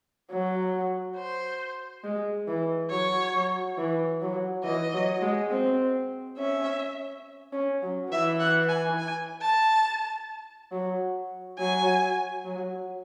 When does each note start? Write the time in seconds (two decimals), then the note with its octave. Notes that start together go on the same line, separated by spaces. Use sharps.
0.31 F#3
1.17 C5
2.04 G#3
2.48 E3
2.90 F#3 C#5
3.34 F#3
3.78 E3
4.21 F#3
4.64 E3 D#5
4.94 F#3
5.22 G#3
5.51 C4
6.38 C#4 E5
7.53 C#4
7.82 F#3
8.11 E3 E5
8.40 F#5
8.68 G#5
8.98 G#5
9.41 A5
10.72 F#3
11.58 F#3 G#5
12.45 F#3